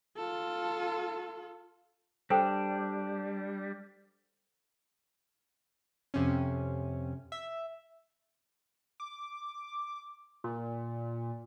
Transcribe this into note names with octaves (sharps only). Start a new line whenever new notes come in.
F4 A4
G3 D4 A4 C5 G5
F2 C3 C#4
E5
D6
A#2